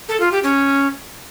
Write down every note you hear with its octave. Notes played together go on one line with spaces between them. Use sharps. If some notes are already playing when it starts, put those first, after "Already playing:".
A4
F4
G4
C#4